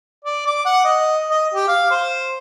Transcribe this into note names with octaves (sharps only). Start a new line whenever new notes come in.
D5
D6
F#5
D#5
D#5
G4
F5
C5